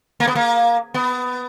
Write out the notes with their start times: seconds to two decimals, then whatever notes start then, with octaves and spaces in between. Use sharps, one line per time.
0.20 A#3
0.27 B3
0.35 A#3
0.94 B3